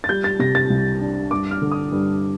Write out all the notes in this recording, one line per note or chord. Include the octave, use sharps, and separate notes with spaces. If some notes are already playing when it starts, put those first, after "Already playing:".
A6
G3 G6
A6
C3 A#6
A6
C2
D4
G2 D6
F6
D3
D#6
G2